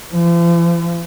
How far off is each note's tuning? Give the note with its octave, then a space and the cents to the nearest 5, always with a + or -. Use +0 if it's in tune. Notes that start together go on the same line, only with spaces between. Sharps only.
F3 -45